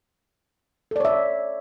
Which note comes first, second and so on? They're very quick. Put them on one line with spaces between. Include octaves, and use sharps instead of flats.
A4 D5 C#5 E5